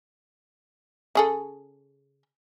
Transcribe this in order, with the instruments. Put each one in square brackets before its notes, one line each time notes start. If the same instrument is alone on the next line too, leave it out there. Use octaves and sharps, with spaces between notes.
[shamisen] C#3 G#4 A4